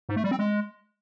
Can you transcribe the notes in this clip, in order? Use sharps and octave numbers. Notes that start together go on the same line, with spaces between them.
G#2
A3
G3
C4
G#3